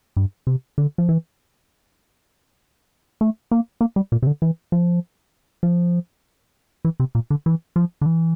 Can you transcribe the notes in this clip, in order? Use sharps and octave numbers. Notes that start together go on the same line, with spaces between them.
G2
C3
D3
F3
E3
A3
A#3
A#3
G3
A#2
C3
D3
E3
F3
F3
E3
C3
A#2
D3
E3
F3
D3
E3